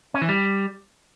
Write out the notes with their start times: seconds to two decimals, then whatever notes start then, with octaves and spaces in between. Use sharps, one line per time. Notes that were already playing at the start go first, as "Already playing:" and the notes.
0.14 C#4
0.22 E3
0.29 G3